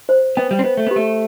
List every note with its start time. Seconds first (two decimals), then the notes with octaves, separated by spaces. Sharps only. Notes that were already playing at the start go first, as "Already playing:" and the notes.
0.09 C5
0.37 B3 G5
0.51 G3
0.59 C4
0.64 B3 C5
0.77 A3
0.87 B3
0.91 G4
0.96 A3